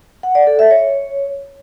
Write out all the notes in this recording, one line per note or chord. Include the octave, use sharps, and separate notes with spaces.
F#5
D5
A4
E5
C#5